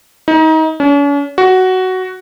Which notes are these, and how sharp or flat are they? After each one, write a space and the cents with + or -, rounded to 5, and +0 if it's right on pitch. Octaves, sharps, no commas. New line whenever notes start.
D#4 +30
C#4 +45
F#4 +10